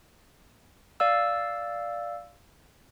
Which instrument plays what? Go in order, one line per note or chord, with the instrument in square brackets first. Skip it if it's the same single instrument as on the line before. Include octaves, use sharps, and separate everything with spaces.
[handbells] D5 F5 E6